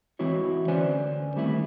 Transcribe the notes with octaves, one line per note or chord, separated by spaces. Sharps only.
E3 G#3 C4 E4 F#4 C#5
D2 C#4 B4 C5 D5 G#5
D#3 G3 A3 C4 E4